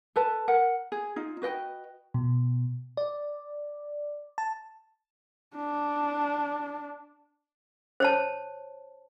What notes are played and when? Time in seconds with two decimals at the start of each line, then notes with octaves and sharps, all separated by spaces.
0.16 A4 B4 A5
0.48 A#4 F#5
0.92 G#4
1.16 D#4 F4
1.42 F#4 B4 D#5 G5
2.14 B2
2.97 D5
4.38 A5
5.56 D4
8.00 C5 C#5 A5